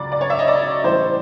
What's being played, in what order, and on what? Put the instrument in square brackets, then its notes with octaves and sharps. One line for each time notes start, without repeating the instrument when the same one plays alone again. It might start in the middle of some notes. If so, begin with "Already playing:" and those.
Already playing: [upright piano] C#2 C#3 F#3 D5
D5
C#5
E5
D#5
D5
A2 E3 G3 C5